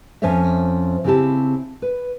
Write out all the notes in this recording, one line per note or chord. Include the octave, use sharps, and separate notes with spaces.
F2 F3 C#4 C5 C#5 E5
C#3 C4 E4 G4 A5
B4